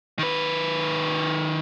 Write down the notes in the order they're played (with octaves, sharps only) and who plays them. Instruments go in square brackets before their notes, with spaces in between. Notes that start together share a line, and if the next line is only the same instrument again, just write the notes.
[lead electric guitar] D#3 B4